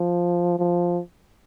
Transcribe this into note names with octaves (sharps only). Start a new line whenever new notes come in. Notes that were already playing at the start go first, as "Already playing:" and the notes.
Already playing: F3
F3